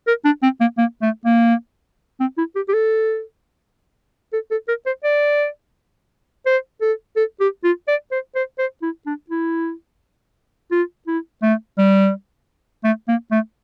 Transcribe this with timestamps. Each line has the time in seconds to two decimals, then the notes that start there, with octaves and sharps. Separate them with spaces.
0.07 A#4
0.25 D4
0.43 C4
0.61 A#3
0.78 A#3
1.02 A3
1.26 A#3
2.20 C4
2.38 E4
2.55 G4
2.69 G4
2.74 A4
4.33 A4
4.51 A4
4.68 A#4
4.86 C5
5.04 D5
6.46 C5
6.81 A4
7.16 A4
7.40 G4
7.64 F4
7.88 D5
8.11 C5
8.35 C5
8.59 C5
8.82 E4
9.06 D4
9.30 E4
10.72 F4
11.07 E4
11.43 A3
11.78 G3
12.84 A3
13.08 A#3
13.32 A3